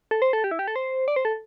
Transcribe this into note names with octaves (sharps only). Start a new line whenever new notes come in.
A4
C5
A4
G4
E4
G4
A4
C5
D5
C5
A4